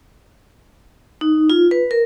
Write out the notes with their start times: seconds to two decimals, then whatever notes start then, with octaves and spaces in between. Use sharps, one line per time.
1.21 D#4
1.50 F4
1.71 B4
1.91 A#4